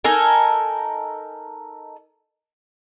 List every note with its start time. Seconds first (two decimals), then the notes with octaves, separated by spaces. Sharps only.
0.04 D#4 A4 A#4 G#5